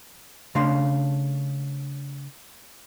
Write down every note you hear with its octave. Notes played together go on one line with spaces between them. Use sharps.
C#3 A3 D4 F5 C6